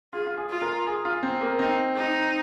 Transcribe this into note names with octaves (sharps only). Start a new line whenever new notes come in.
F4 G#4
F4
G#4
F4
A#4
G#4
F4
C4
A#3
C4 D#4
D#4